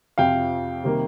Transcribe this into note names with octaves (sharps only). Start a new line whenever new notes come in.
F2 C3 F3 F5 G5
C3 D#3 G3 A#3